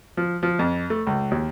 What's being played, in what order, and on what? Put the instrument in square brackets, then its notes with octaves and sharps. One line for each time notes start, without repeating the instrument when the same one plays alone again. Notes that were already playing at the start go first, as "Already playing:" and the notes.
[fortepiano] F3
F3
F2
A3
C#2
D#2